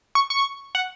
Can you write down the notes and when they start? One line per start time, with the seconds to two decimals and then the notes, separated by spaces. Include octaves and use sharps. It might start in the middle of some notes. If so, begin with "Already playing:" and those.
0.15 C#6
0.30 C#6
0.75 F#5